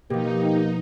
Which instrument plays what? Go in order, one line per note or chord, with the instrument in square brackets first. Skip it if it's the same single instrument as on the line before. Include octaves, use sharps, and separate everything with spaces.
[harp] B2 F3 [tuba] A#3 [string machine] D#4 [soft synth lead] G4